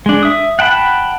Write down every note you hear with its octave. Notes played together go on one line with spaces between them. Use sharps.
G#3 D4
E5 D#6
F#5 G5 A5 B5